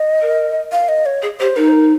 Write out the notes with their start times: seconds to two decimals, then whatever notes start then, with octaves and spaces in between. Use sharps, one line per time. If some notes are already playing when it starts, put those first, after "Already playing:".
Already playing: D#5
0.21 A#4
0.72 F5
0.89 D#5
1.06 C#5
1.22 G#4
1.40 G4 C5
1.56 D#4 A#4
1.69 C5
1.72 A#4